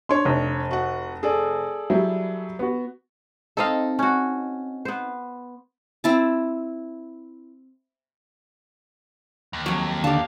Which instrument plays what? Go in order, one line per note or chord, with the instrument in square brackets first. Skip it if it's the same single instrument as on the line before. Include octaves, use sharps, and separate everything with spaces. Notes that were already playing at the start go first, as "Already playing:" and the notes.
[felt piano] D4 C#5 [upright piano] C6
[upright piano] F1
[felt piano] F#4 F#5
G#4 A4 D5
[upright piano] F#3 G3 E4
B3 F#4
[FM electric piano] C4 D#4 [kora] A4 D#5 F5
[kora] C#4 F#4
B3 C5
[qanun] C4 E4 A5
[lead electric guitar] D#2
[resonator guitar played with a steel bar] F2 F#3
[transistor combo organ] D3 [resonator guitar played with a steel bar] G4 A5 [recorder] F5